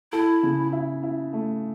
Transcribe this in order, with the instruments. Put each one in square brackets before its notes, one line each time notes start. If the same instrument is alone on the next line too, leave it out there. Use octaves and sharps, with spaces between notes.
[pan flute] E4 [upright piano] A4
[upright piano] C#3
E4
E4
A3